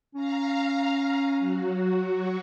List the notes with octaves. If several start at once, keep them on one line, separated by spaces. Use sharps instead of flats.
C#4 F5 A#5
F#3 F#4